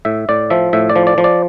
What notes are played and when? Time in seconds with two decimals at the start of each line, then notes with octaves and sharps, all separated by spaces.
0.05 A2 E5
0.29 A2 D5
0.50 F3 E5
0.73 A2 E5
0.90 D5
0.96 F3
1.07 D5
1.18 F3
1.24 D5